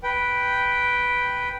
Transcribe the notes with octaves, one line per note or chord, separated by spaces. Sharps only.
B4 G5